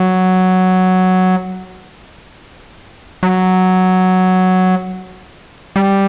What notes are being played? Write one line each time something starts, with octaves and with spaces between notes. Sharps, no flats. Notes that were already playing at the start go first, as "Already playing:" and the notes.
Already playing: F#3
F#3
G3